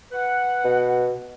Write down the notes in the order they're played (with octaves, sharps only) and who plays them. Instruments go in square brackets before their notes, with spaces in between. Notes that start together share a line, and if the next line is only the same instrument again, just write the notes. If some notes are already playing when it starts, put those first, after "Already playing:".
[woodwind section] B4 F#5
[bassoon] B2